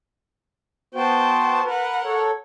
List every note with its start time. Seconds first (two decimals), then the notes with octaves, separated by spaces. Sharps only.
0.95 B3 F#4 C5 G5 A5
1.65 A#4 B4 F#5
2.05 A4 C#5